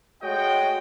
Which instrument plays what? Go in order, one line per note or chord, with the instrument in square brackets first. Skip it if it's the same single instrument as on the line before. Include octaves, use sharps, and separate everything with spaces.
[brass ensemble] G#3 A3 F#4 C#5 D#5 G5